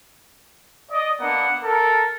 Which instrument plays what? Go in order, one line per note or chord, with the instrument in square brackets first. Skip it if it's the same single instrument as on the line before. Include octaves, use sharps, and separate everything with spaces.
[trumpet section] D5 D#5
[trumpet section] A#3 B3 D4 [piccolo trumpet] F#5
[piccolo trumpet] A4 [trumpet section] A#4